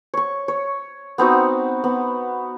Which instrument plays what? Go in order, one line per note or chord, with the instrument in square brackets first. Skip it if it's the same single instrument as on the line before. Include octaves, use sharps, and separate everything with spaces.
[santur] C#5 C#6
C#5
B3 C4 D#4 F#4
B3